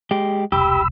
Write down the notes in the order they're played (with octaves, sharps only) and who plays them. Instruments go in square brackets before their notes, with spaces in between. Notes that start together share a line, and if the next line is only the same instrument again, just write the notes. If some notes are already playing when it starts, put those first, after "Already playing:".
[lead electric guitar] G#3 G4
[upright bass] E1 C2 [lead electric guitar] G4 [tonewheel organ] B5 E6